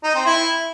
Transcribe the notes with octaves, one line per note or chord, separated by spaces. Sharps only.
D#4
C4
E4